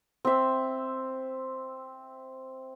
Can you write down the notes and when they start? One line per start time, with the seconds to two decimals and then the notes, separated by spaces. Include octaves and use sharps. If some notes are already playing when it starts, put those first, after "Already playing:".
0.25 C4 E5